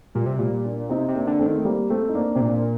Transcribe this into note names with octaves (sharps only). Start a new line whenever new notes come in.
A#2 G3
C3
A#2 G3
A#3 D4
C3 C4 D#4
C3
A#3 D4
D3
A3 C4
D#3
A3
G3 A#3
A3 C4
D#4
A#3 D4
C3 C4
A#2 A#3 D4
A#3